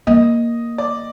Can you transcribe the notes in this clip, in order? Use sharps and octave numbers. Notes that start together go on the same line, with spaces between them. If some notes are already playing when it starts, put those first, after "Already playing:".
A#3 D#5
D5